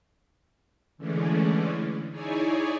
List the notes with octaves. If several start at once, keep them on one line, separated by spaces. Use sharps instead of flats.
D3 E3 G#3 A3 C#4 D4
D#4 E4 G#4 C#5 D5 G#5